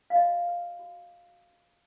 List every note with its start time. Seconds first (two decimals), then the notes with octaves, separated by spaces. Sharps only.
0.10 F5
0.16 F#4 D#5
0.48 B4
0.79 F#4